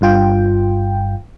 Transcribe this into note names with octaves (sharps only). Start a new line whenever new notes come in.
G1 G2 F4 G5